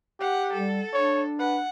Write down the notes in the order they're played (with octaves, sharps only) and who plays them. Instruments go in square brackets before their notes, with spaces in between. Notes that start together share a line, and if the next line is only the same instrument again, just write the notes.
[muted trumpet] G4 [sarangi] F#5
[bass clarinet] G3 [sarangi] A4
[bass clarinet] D4 [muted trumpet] C#5
[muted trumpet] B4 [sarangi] F#5